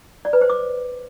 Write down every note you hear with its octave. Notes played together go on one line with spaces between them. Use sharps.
D5
B4
C5
D6